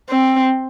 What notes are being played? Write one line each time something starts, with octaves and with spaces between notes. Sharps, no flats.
C4